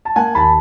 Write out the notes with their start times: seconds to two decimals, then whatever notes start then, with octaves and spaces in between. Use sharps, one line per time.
0.05 A5
0.16 A#3 F#5 G#5
0.35 D#2 A5 B5